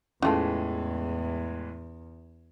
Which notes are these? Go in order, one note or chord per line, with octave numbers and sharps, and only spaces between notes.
E2 A2 E3 F3 G#3 A3 C#4 A5